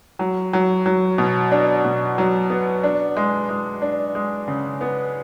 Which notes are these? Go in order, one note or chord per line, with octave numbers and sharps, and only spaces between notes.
F#3
F#3
F#3
B2
D4
B2
F#3
B3
D4
G#3
G#3
D4
G#3
C#3
B3